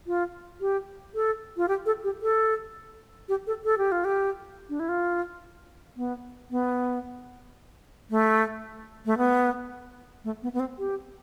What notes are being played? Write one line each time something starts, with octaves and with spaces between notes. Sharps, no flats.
F4
G4
A4
F4
G4
A4
G4
A4
G4
A4
A4
G4
F4
G4
D4
E4
F4
B3
B3
A3
A3
B3
A3
B3
B3
C4
G4